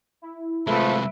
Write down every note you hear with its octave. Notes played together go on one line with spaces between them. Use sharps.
E4
C3 F3 G#3 A3 B4 E5